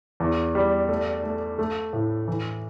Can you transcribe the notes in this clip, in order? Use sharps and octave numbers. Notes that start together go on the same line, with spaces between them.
E2
G3
A3
A3
A3
A2
E3